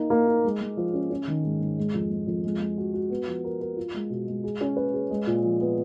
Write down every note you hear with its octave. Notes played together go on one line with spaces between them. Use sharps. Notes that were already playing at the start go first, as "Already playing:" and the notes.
Already playing: A#3 D#4
A#3
D#4
G#3
G#3
F3
C#4
C#4
D#3
G#2
G#2
G#3
F2
G#3
F2
G#3
G#3
F#4
F#4
B3
F3
A#4
A#4
F4
G#3
B2
G#3
G#4
C#4
B4
G#4
G#3
A#2
F3
B3